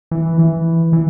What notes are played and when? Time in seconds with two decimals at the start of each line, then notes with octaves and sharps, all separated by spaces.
0.11 E3
0.39 E3
0.93 E3